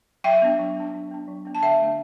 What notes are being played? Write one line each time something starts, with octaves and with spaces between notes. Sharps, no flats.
F#3 E5 G5
B3 D4
F#3
B3 D4
F#3
B3 D4
F#3
B3 D4
A5
D3 E5 G5
A3 D4